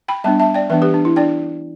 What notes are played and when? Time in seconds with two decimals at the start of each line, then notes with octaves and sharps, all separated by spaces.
0.08 G5 B5
0.24 G3 B3 D4 E5 A5
0.40 E5 A5
0.54 D5 G5
0.70 E3 B3 D4 B4 E5
0.82 G4 B4
0.94 D4
1.05 E4
1.16 D4 D5 G5